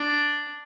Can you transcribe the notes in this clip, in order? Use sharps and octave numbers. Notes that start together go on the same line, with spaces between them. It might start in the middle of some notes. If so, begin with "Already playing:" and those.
Already playing: D4